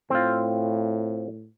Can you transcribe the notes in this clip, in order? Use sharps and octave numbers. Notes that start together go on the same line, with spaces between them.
A2 C4 F4